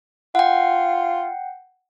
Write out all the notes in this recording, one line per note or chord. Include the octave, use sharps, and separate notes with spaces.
F4 F#5 G5